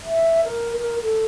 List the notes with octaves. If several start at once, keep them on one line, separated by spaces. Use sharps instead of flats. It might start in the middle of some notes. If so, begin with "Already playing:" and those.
E5
A#4
A#4
A4